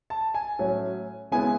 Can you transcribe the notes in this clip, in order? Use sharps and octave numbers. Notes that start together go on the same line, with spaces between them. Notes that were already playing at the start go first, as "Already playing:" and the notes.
A5
G#5
A2 F#3 C#4
C#3 G#3 B3 E4 G#5